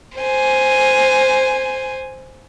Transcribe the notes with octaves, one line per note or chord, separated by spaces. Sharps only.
C5 G#5